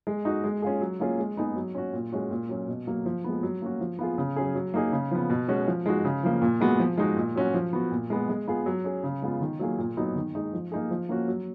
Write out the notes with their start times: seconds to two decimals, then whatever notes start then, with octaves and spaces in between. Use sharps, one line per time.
0.07 G#3
0.25 D#4 F#4
0.44 G#3
0.62 C#4 F4 G#4
0.81 F#3
1.00 A#3 C#4 F4 G#4
1.19 G#3
1.37 B3 D#4 G#4
1.56 F#3
1.75 C#4 F#4
1.93 A#2
2.12 G#3 C#4 F#4
2.31 A#2
2.49 F#3 C#4
2.68 B2
2.87 F#3 A#3
3.06 F3
3.24 G#3 B3
3.43 F#3
3.62 A#3 C#4 F#4
3.80 F3
3.99 B3 F4 G#4
4.18 C#3
4.36 F#3 C#4 G#4
4.55 F#3
4.74 A#3 D#4 G#4
4.92 C#3
5.11 F3 B3
5.30 B2
5.48 G#3 C#4 F#4
5.67 F3
5.86 G#3 D#4 F#4
6.05 C#3
6.23 F3 A#3
6.42 A#2
6.61 G#3 B3 F#4
6.79 F3
6.98 G#3 D#4 F#4
7.17 A#2
7.35 F#3 C#4 F#4
7.54 F3
7.73 B3 F#4
7.91 A#2
8.10 G#3 B3
8.29 G#3
8.48 B3 F4 G#4
8.66 F#3
8.84 C#4 G#4
9.04 C#3
9.22 G#3 B3 F4
9.41 D#3
9.60 F#3 A#3 F4 G#4
9.78 A#2
9.97 F#3 B3 D#4
10.15 D#3
10.35 G#3 D#4
10.53 F3
10.72 A#3 D#4 G#4
10.91 F3
11.09 A#3 C#4 F#4
11.28 F#3